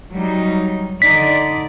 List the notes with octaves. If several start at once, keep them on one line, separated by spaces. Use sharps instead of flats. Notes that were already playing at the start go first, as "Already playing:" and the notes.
F#3 G3 D#4
D3 D#4 D5 B6